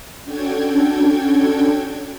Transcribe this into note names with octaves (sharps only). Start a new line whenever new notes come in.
C#4 D4 F#4 A4 G5 G#6